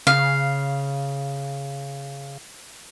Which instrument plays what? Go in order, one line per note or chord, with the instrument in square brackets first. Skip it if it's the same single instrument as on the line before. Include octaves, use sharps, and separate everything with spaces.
[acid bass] C#3 [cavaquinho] F5